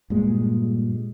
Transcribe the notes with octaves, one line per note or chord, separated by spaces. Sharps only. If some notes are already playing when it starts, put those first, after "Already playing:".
G2 A#2 G#3